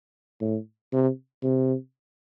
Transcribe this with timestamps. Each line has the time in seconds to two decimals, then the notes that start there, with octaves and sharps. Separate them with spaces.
0.41 A2
0.92 C3
1.43 C3